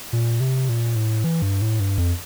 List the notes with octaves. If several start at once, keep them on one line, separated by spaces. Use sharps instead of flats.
A#2
C3
A#2
A2
E3
G2
A2
G2
F2